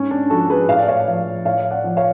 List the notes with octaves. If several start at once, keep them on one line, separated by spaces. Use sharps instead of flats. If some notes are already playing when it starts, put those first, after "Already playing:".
Already playing: G#2 C#4
D4
F3 F#4 A4
G#4 B4
A2 F5
D5
C#5 F5
F3
A2 C#5 F5
D5 F#5
F3
C#5 F5